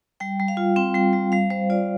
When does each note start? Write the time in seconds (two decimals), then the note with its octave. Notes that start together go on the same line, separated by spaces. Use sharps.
0.20 G3 G5
0.40 G3
0.48 F5
0.57 F4
0.76 C4 G5
0.94 G3 G5
1.13 G3
1.32 G3 F5
1.50 G3 C5
1.70 F4 D5